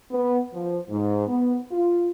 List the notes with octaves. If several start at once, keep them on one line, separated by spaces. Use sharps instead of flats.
B3
F3
G#2
B3
F4